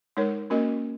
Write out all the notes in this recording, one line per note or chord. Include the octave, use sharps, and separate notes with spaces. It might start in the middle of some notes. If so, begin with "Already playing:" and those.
G#3 D#4 A#4 C#5
A#3 C#4 F#4 A#4 D#5